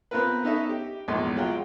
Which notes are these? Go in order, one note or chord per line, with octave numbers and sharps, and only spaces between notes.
B3 C4 F4 A#4 B4
B3 C#4 D#4 A4 D#5 E5
G4
A#1 E2 G#2 C6
F#3 G#3 F4 F#5 G5